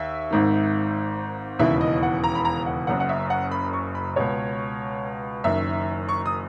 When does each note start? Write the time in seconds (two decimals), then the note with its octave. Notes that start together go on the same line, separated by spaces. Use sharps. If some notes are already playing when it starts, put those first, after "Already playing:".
Already playing: D#2 E5
0.31 G#1 G#2 D#3
1.59 E1 D#2 C#3 E3 E5
1.81 D#5
2.03 F#5
2.24 A#5
2.35 B5
2.45 A#5
2.66 F#5
2.87 F#1 F#2 C#3 F#5
3.00 F#5
3.09 E5
3.30 F#5
3.52 B5
3.73 C#6
3.95 B5
4.16 C#2 B2 C#5
5.44 F#1 F#2 D#3 E5
6.09 C#6
6.26 D#6